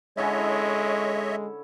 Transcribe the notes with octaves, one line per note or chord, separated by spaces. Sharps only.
D3 G#3 C#4 E4 C#5 D#5 E5